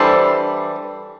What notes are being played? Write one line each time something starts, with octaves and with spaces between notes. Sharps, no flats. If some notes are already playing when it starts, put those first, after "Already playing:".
Already playing: E3 G3 D4 A4 C5